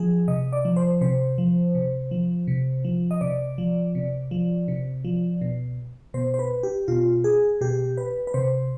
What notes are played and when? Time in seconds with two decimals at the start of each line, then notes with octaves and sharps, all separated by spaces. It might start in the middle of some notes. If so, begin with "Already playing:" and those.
Already playing: F3 G#4
0.28 C3 D#5
0.53 D5
0.65 F3
0.76 C5
1.01 C3 C5
1.38 F3
1.75 C3
2.11 F3
2.48 C3
2.85 F3
3.11 D#5
3.21 C3 D5
3.58 F3
3.95 C3
4.31 F3
4.68 C3
5.05 F3
5.41 B2
6.14 B2 C5
6.34 C5
6.39 B4
6.63 G4
6.88 B2 F4
7.24 G#4
7.61 B2 G4
7.97 B4
8.27 B4
8.34 C3 C5